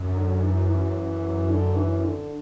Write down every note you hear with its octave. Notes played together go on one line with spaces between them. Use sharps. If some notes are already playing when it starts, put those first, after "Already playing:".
Already playing: F#2
D3
E3
E3
D3
E3
D3